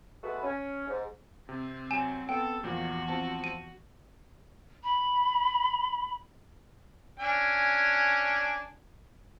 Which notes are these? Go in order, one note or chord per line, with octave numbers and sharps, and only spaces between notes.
G#3 A3 B3 F#4 B4
C#4
G#2
C3 C4
F#3 G#5 E7
B3 A4 G5
E2 A#2 F3 F#4
F3 C4 A5
D#7
B5
C#4 D4 G#5